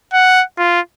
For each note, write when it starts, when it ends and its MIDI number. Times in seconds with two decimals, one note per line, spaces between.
0.13 0.43 78
0.58 0.80 65